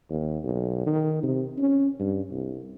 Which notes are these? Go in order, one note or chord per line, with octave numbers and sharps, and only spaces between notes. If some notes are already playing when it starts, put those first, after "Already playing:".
D#2
B1
D#3
C3
C#4
G2
C2